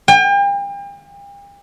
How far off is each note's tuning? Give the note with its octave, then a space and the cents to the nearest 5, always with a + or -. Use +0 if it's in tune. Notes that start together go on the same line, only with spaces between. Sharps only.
G5 +40